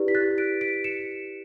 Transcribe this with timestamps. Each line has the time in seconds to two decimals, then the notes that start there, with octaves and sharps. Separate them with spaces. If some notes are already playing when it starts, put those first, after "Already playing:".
Already playing: E4 G4 B4 D5
0.08 B6
0.15 F#6 A6
0.38 B6 D7
0.61 B6 D7
0.84 C#7 E7